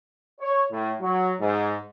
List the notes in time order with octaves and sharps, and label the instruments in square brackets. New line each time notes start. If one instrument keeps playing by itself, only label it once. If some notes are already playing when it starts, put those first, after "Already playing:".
[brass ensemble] C#5
A2
F#3
G#2